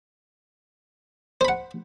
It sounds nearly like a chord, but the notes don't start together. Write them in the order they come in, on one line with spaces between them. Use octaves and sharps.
C5 B5 F#5